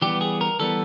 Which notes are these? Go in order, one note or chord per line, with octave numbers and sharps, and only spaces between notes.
E3 G3 B3 G4
G#4
A#4
E3 G3 B3 A4